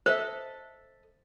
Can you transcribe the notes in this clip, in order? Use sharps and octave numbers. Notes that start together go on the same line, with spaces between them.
A4 C5 D#5 E5